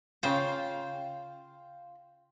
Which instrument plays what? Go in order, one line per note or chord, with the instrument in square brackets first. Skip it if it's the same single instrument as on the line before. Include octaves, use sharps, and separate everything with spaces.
[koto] C#3 C5 [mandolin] F4 G5